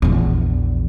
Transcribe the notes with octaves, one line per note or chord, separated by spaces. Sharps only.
A#1 E2